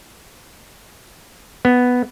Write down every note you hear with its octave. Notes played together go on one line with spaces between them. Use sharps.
B3